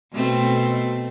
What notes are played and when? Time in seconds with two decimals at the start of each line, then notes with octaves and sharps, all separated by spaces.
0.12 B2 A3 C4